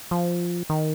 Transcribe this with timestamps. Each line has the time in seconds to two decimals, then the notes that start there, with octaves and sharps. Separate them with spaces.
0.11 F3
0.70 D#3